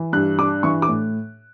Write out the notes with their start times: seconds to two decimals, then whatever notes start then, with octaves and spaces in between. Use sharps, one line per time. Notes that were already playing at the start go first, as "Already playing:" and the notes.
Already playing: E3
0.13 G2 F#6
0.39 D4 D6
0.63 E3 C#6
0.82 D6
0.89 A2